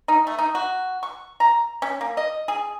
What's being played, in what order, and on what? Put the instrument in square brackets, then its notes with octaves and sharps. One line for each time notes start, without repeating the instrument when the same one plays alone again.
[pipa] D#4
A3
D#4
F#4
C#6
A#5
C#4
A#3
D#5
G#4